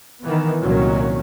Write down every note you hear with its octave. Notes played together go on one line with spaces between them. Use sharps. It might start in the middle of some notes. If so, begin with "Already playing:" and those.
D#3 E3 B3
C2 A#2 D#3 F#3 C#4